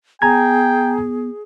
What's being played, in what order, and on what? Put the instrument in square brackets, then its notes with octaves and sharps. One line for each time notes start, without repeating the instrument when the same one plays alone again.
[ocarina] B3 [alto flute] G#4 [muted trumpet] G5 [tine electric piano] G#5 A#5 G#6